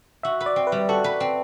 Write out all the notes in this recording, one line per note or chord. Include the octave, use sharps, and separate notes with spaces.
F#4 E5
B4
D5
C4
B4
G3
F#4 A4
B4
C4